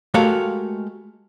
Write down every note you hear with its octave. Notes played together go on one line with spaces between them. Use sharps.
G#3 A3 F#4 G4 A#4 F5